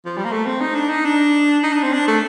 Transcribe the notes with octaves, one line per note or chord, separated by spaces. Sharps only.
F3
G3
A#3
A3
C4
D#4
D4
D#4
D4
D#4
D4
C4
D4
A3